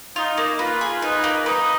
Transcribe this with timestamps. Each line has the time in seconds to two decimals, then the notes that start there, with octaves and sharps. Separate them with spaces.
0.16 D#4 F4
0.37 A#3
0.59 F4 B4
0.81 G#4
1.02 D#4 B4
1.24 A#3
1.46 D#4 B4